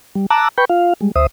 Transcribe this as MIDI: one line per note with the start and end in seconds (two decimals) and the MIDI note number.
0.15 0.26 55
0.30 0.48 81
0.30 0.48 82
0.30 0.48 86
0.30 0.48 88
0.30 0.48 90
0.58 0.65 71
0.58 0.65 79
0.58 0.65 83
0.58 0.65 85
0.58 0.65 91
0.69 0.93 65
0.69 0.93 77
1.01 1.11 55
1.01 1.11 56
1.16 1.26 38
1.16 1.26 72
1.16 1.26 76
1.16 1.26 87